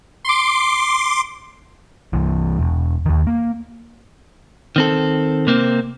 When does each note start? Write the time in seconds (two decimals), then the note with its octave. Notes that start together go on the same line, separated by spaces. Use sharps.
0.25 C6 D6
2.13 C2 E3
2.59 E1
3.06 D#2 D#3
3.27 A#3
4.76 D#3 C4 A4
5.47 C3 A#3 C4